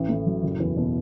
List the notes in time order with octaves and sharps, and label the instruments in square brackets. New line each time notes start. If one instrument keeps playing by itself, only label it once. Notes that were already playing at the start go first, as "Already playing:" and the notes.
Already playing: [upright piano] A1
A2
F#3
F#1
E2
B2